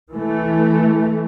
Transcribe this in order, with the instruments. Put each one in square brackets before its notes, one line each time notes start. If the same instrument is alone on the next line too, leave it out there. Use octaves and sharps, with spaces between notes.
[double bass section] E3 A3